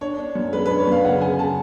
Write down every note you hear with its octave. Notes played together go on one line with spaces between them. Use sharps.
D4 C#5
D4
F#2
G#3 B4
B4
D4
C#5
F#2 F5
C#3 F#5
C#3 G#5
C#3 A5